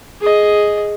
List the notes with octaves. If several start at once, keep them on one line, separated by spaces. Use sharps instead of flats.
G#4 D#5